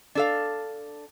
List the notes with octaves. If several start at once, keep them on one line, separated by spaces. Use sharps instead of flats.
D4 A4 F5